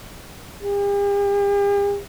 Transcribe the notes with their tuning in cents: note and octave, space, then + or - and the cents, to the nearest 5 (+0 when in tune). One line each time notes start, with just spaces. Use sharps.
G4 +45